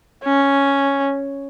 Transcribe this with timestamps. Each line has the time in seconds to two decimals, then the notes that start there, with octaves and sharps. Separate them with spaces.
0.24 C#4